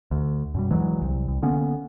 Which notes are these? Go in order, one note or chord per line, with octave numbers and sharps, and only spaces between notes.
D2
F#2 B2 G3
D2 E3 F#3 G#3
C2
C2
D3 A#3 B3 C#4